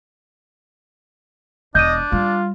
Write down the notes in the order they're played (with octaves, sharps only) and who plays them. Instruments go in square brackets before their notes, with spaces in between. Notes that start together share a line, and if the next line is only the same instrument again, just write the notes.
[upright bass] E1 [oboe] D4 [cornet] D#5 [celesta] G6 D#7
[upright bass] G3 [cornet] F4